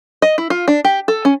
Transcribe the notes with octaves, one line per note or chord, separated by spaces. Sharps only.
D#5
E4
F4
D4
G4
A4
C#4